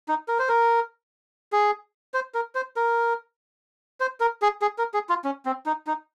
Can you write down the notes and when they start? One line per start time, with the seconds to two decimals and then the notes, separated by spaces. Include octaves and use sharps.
0.08 D#4
0.28 A#4
0.39 C5
0.49 A#4
1.53 G#4
2.14 C5
2.34 A#4
2.55 C5
2.76 A#4
4.00 C5
4.20 A#4
4.42 G#4
4.62 G#4
4.78 A#4
4.94 G#4
5.09 F4
5.24 C#4
5.45 C4
5.66 D#4
5.87 D#4